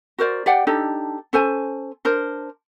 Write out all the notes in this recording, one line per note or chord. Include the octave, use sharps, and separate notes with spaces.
F#4 A#4 C5 D5
G4 D5 F#5 G5
D4 D#4 G4 A4
C#4 A4 C5 G#5
D4 A#4 C5